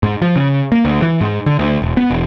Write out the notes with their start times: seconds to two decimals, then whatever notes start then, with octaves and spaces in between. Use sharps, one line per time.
0.03 G#2
0.22 F3
0.36 C#3
0.72 A#3
0.85 D2
1.02 E3
1.21 G#2
1.46 D3
1.59 D2
1.82 E1
1.97 B3
2.10 E1